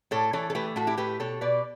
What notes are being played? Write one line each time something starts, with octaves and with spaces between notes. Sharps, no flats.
A2 A4 C#5
E3 A4 C#5
A4
A3 G4 B4
A2 F#4 A4
E4 G4
A3 G4 B4
B2 A4 C#5
B2 B4 D5